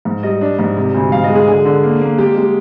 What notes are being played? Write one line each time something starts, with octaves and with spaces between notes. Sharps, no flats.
G#2
G3 D#5
D4
G#2
C3
D2
G#2 F5
D#5
G#3
G#4
D3 G#4
D3
A#3
A#3
G#3 G4
G#3